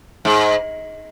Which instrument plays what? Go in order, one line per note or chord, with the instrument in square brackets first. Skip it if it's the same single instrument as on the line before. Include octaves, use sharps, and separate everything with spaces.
[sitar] G#2